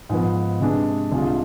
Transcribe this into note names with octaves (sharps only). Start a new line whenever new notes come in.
G#2 F3 B3
C3 G#3 D4
C2 C3 G#3 D4 F4